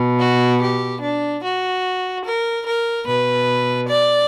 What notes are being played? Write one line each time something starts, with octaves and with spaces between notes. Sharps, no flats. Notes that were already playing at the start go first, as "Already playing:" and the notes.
Already playing: B2
F#4
G4
D4
F#4
A#4
A#4
B2 B4
D5